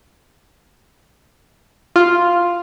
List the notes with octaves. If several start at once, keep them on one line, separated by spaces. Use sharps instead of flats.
F4